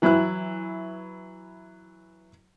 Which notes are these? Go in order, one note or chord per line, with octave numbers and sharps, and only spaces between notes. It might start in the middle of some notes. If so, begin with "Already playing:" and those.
E3 F#3 E4 B4 F#6